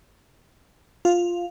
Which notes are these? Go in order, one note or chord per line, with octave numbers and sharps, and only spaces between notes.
F4